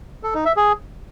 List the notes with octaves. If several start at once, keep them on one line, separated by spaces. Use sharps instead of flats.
A4
D#4
E5
G#4